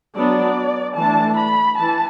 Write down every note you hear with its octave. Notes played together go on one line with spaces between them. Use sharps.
F#3 B3 D4 D5
E3 A3 D4 A5
B5
E3 A5